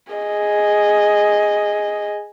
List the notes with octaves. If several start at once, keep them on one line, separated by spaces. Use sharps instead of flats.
G#4 D#5